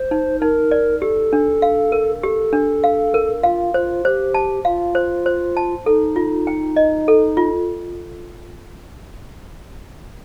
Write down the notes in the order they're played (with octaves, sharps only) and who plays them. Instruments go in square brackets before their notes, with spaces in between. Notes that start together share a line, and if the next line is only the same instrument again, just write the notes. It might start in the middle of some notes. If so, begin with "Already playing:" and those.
Already playing: [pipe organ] C5
[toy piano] D#4
[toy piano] D#4 [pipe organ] A#4
[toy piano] D5
[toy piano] G4 [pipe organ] A4
[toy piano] D4
F5
A#4
[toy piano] G4 [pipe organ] A4
[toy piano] D4
F5
A#4
[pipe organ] F4 [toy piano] F5
[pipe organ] F4 [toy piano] C5
[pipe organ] G4 [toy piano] C5
[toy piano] A5
[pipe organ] F4 [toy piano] F5
[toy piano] C5
C5
A5
[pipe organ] D#4 [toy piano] A4
[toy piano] F4
G5
D#5
A4
F4